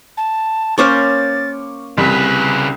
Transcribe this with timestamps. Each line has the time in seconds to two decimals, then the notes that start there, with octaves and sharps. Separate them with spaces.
0.17 A5
0.78 A#3 C#4 C5 C#6 D6 F6 A6
1.98 C2 C#3 B4 B6